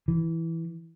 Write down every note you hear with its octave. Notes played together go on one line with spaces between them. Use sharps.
E3